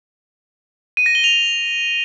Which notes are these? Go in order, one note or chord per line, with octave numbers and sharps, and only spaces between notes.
D#7
A#6
G7
F7